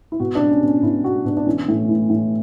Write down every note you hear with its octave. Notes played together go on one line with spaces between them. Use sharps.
E4
B2 F#4
D4
B2
C#4
B2
C#4
B2 E4
B2 F#4
B2 D4
D4
E3 C#4
A2
E3
A2